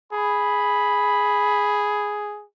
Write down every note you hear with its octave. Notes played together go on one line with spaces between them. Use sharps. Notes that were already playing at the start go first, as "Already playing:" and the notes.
G#4 B5